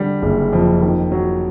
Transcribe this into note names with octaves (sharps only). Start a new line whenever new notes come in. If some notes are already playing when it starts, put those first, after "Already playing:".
Already playing: D3 G3
F#1
F2
D#3
F#3